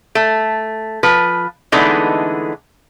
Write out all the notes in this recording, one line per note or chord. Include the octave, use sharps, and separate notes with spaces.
A3
F3 B4
D3 E3 G#3 A3 B3 D#4